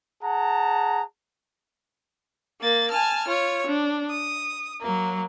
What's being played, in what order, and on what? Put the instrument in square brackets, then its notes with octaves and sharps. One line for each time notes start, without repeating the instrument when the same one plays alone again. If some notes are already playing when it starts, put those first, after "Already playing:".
[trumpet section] G#4 F#5 A5 A#5
[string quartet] A#3 A6
G#5 A5 F6
F4 C#5
D4
D#6
F#3 A#3